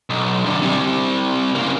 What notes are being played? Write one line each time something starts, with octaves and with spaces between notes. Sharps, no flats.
B1
F#2 D3
C3 G3
C#3 A#3